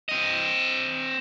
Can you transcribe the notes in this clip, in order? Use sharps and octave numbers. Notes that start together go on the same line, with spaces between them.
C4 D#5